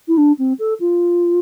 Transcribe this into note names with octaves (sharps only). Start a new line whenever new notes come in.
E4
D4
C4
A4
F4